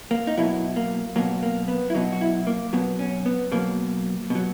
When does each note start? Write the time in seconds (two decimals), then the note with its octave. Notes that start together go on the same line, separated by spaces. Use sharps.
0.11 A#3
0.27 D#4
0.37 B2 F#3 E4
0.76 A#3
1.16 B2 F#3 A#3
1.43 A#3
1.68 B3
1.90 E4
1.95 B2 F#3 D#4
2.12 F#4
2.21 E4
2.47 A#3
2.73 B2 F#3 B3
2.99 C#4
3.26 B3
3.52 B2 F#3 A#3
4.30 B2 F#3